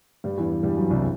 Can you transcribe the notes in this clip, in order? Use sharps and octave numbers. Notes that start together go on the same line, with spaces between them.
G2 G3
E2 E3
G2 G3
F#2 F#3
C2 C3